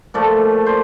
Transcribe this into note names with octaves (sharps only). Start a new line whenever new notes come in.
A#2 F3 A3 D5
C5